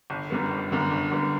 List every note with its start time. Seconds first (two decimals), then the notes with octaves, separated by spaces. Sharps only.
0.10 G1
0.30 F#2 D3 G3 B3
0.51 G1
0.71 F#2 D3 G3 B3
0.91 G1
1.12 F#2 D3 G3 B3